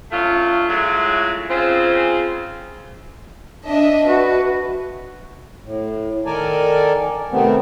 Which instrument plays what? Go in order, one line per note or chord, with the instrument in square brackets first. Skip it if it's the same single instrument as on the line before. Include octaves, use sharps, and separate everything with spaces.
[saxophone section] F#3 A3 C#4 D4 F4
F#3 G#3 A3 C#4 E4 F4
C#3 C4 F4
[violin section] D4 D#5 E5
[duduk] F#4 [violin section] B4
[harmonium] A2
D#3 A4 A#4 D5 G#5
C3 D#3 A3 B3 C4